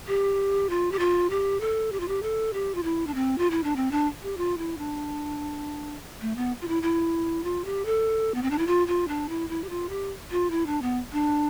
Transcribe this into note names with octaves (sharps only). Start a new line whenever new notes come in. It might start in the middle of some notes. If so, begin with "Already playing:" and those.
G4
F4
G4
F4
G4
A4
G4
F4
G4
A4
G4
F4
E4
D4
C4
F4
E4
D4
C4
D4
G4
F4
E4
D4
A3
B3
F4
E4
E4
F4
G4
A4
B3
C4
D4
E4
F4
F4
D4
E4
E4
G4
F4
G4
F4
E4
D4
B3
D4